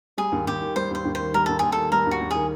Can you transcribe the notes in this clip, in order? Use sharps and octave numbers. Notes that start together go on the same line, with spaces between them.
G3 G#4
D#2
D#2 G4
D#3
G3 C5
D#2 C5
D#2
D#3 C5
G3 A#4
D#2 A4
D#2 G#4
D#3 A4
G3 A#4
D#2
F#4
D#2
D#3 G#4